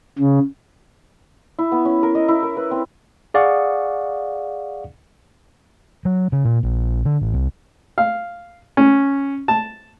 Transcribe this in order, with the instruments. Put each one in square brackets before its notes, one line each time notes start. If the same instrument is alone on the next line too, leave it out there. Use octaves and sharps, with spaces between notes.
[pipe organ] C#3
[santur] E4
B3
C#4
A#4
D#5
E4
A#4
B4
C4
[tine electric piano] G#4 D5 F5 F#5 C#6 D#6
[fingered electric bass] F#3
C#3
A#2
A#1
D3
A1
C2
[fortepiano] F5
C#4
A5